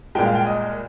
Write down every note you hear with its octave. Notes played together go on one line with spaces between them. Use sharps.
C2 A#2 G#3 G5
F5
G5
D#5